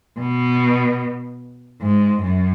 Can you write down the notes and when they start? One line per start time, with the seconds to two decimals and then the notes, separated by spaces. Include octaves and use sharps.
0.18 B2
1.82 G#2
2.23 F#2